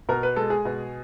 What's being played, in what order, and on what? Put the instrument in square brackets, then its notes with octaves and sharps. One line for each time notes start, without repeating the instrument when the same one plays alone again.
[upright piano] B2 A#4
B4
G#3 A4
G#4
B2